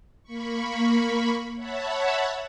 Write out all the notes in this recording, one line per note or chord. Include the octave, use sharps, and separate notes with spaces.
A#3 B5 C#6
C#5 E5 F#5 A5 B5